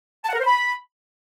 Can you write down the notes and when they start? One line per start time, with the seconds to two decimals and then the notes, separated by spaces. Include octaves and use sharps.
0.24 A5
0.29 F#5
0.35 A#4
0.40 C5
0.45 B5